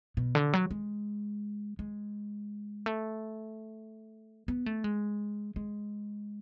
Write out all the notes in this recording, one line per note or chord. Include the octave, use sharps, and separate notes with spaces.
B2
D3
F#3
G#3
G#3
A3
B3
A3
G#3
G#3